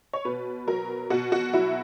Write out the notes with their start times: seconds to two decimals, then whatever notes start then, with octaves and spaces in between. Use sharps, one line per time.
0.13 C#5
0.25 B2 B4
0.67 F#3 A#4
1.10 B2 F#4
1.32 F#4
1.53 F#3 E4